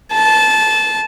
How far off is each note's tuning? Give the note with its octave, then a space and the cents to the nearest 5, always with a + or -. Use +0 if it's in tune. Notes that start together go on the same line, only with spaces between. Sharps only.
A5 -20